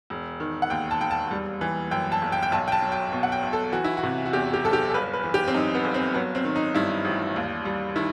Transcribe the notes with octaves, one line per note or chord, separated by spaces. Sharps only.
E1
D#3
F#5
D#2 G5
A5
E1 G5
A5
G3
E3
F#2 G5
A5
G1
G5
G5
B1 A5
G5
A5
F#3
G5
B2
F#5
G5
B1
A4
E3 F#4
E4
F#4
C3
F#4
E2 G4
G4
F#1 A4
G4
A4
G1 B4
B4
E3
G4
C4
F#2 D#4
B3
G1
C4
F#3 B3
C4
D#3
D#4
G2 E4
A1
D#2
G3
D#3 E4